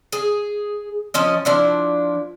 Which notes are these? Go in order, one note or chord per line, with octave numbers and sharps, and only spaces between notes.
G#4
F3 C#4 D#5
F3 D4 E4